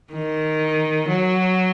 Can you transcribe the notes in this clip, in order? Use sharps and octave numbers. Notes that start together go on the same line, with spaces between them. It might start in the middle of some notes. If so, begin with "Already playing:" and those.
D#3
F#3